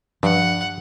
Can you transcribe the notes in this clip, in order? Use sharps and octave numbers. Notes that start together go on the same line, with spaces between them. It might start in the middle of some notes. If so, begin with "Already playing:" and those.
G2 F3 F#5